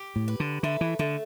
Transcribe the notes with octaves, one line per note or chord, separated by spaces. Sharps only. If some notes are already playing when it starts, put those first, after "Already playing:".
Already playing: G4
A2
B4
D3
D3 A3
E3
D3 A3